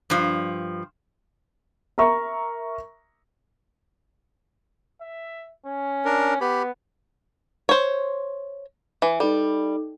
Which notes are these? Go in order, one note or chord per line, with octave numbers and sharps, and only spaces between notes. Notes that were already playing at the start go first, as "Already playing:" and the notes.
G2 F3
A#4 E5 A#5 C#6
E5
C#4
D4 A#4
B3 G4 B5
C5 C#5
E3
G3 D#4 A4